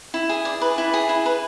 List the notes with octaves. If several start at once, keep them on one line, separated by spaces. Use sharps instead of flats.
E4
G#4
D5
B4
E4
G#4
E4
B4